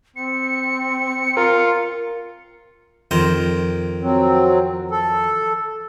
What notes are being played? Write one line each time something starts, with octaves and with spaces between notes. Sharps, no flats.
C4 C#7
F4 A#4
F2 D#3 C5
F#3 C4
A4